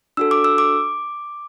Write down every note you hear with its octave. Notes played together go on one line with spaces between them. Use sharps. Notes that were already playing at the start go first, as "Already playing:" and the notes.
D4 F#4 A4 E6
D6
E6
D6